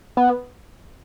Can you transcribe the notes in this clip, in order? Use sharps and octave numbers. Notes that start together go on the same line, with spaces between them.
B3